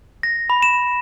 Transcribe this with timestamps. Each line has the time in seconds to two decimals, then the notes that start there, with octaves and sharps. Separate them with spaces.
0.23 A#6
0.50 B5
0.63 E7